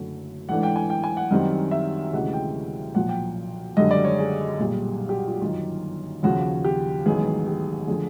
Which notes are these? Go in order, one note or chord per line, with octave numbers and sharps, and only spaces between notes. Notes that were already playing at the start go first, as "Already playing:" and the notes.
Already playing: F#1 F#2 D3 F#3 A3
A1 G#2 E3 A3 D4 F#5
G5
G#5
G5
G#5
F#5
F#2 D#3 G3 C4
E5
D2 C3 E3 G#3 C#4 F#5
G5
B1 A#2 F3 F#5
G5
G#1 F#2 D3 G3 D#5
D5
C#5
G#4
B1 A#2 G3
G4
F#4
F4
G1 F#2 D#3 F4
D#2 C#3 F3 F#4
G4
A1 G#2 D#3 F#3 B3 G#4
G4
D3 F3 A3 G#4